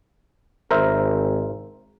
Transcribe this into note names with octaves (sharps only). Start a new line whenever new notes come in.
G#1 A#4 C5 E5